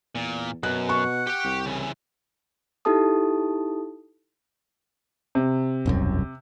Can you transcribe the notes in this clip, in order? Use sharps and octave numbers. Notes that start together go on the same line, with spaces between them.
E2 A#2
F#2 B2 F#6
F#5 C#6
G4 G5
C2
C#3 E3
D#4 E4 G4 A4 A5 D#6
C3
E1 C2 F#2